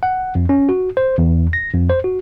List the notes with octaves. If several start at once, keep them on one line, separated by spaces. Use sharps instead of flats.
F#5
F2
C#4
F#4
C5
E2
A#6
F2
C5
F#4